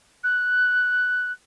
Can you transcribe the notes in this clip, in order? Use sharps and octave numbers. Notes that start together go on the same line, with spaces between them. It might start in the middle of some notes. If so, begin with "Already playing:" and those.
F#6